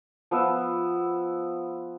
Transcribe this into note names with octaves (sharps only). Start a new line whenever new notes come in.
F3 B3 E5